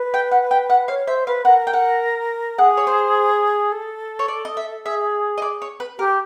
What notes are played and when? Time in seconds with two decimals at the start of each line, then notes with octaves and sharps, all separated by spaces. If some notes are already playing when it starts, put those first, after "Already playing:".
Already playing: B4
0.14 G5
0.31 F#5
0.51 G5
0.70 F#5
0.88 C#5 F5
1.07 C5 E5
1.27 B4 F5
1.45 A#4 F#5
1.67 G5
1.73 F#5
2.58 G#4 F#5
2.77 C#5
2.87 C5
3.72 A4
4.19 C#5
4.28 D5
4.45 D#5
4.57 E5
4.85 G#4 E5
5.38 D#5
5.42 D5
5.62 C#5
5.80 B4
5.99 G4 A#4